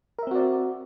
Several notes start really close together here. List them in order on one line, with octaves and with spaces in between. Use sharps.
A#4 E5 C4 F#4 D5